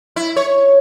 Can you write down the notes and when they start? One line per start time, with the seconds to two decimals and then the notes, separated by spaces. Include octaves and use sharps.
0.16 E4
0.36 C#5